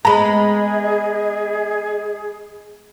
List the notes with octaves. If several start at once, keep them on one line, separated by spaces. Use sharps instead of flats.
G#3 B3 G#4 D#5 A#5 B5